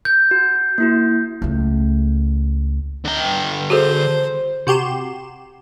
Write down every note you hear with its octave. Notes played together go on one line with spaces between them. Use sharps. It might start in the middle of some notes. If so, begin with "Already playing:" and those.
G6
F#4
A#3 E4 F#4
C#2 A3
D3 G5
F#4 G#4 A4 C5
C3 F#4 G4 C6 E7